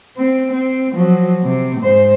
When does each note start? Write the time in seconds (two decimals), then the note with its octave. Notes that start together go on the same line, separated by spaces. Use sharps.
0.17 C4
0.51 C4
0.94 F3 F#3
1.43 C3
1.80 G#2 C5